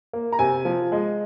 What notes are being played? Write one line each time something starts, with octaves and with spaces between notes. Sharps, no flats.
A#3
A#5
C3 G#5
F3
G#3